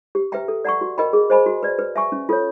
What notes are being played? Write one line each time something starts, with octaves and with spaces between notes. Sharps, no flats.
G4
B4 E5 G5 A#5
A4
D5 F#5 A#5 C#6
F#4
A#4 D#5 G5 B5
G#4
C5 D#5 G#5 B5
F#4
B4 D5
B4
E5 G#5 C#6
C#4
F4 A4 C#5